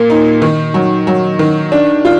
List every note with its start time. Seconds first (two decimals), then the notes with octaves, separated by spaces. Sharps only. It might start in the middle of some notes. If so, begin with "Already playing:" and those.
Already playing: A#2 A#3
0.10 D#4
0.42 D#3
0.74 F#3
1.07 F#3
1.39 D#3
1.72 D4
2.05 F4